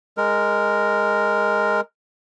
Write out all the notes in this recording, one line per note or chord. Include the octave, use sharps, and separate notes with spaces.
G#3 A#4